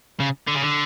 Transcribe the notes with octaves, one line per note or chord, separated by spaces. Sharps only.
C#3
D3
C#3
D3